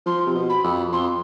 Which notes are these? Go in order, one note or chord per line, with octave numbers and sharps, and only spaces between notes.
F3 C6
C3
B2
B5
F2
F2 C6